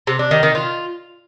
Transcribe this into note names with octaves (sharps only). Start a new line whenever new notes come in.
C3
D4
D#3
D#3
F4